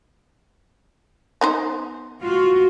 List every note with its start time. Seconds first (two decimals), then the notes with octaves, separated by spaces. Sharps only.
1.41 B3 D#4 C5
2.21 F4 F#4